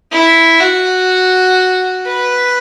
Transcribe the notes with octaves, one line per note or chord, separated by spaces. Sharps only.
E4
F#4
B4